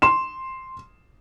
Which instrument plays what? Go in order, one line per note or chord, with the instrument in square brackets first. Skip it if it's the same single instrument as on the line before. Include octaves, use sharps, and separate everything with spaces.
[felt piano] C6 E7